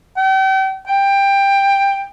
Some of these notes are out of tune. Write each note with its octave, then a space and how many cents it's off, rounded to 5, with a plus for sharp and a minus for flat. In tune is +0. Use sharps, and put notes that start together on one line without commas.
G5 -40
G5 +15